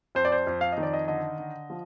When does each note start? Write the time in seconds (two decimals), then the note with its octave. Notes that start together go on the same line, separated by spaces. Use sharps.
0.15 F2 C5
0.25 D5
0.32 C5
0.47 F2
0.61 F5
0.72 D#5
0.78 D#3
0.83 D5
0.93 D#5
1.08 D3 D#5
1.38 D3
1.70 F3